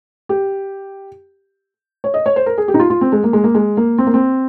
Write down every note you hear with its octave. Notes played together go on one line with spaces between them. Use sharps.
G4
C#5
D#5
C#5
C5
A#4
G#4
G4
D#4
F4
F4
C4
G#3
A#3
G#3
A#3
G#3
A#3
C4
A#3
C4